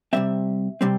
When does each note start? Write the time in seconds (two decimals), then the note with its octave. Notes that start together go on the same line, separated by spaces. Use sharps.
0.13 C3 G3 C4 E5
0.81 C3 G3 C4